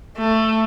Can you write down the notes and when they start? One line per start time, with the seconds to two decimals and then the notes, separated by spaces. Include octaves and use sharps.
0.17 A3